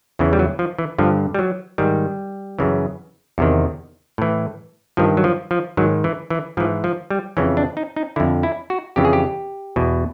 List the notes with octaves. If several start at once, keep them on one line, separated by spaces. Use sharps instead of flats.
E2 C#3 E3
G3
F#3
F3
E3
G2 D3 F3
G3
F#3
G#2 D#3 G3
F#2 C#3 E3
E2 C3 D#3
A2 E3
G2 D#3 F3
F#3
F3
F3
G#2 D#3 F#3
E3
E3
G#2 E3 F3
F3
G3
F2 C#3 E3 C#4
D4
D#4
D#4
F2 D3 E4
E4
F#4
F2 C#3 E3 G4
G#4
G4
E2 B2